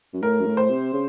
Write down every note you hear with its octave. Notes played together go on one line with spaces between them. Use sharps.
F#2
A2 A#4
F#2
A2
C5
C3
C#3